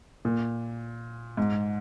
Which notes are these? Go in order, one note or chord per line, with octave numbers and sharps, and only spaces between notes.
A#2
G#2